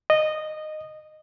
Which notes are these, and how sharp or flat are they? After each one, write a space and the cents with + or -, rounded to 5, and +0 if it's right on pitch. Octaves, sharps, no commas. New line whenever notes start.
D#5 -10